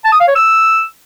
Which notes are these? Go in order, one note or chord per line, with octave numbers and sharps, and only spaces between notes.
A5
D#6
F5
C#5
E6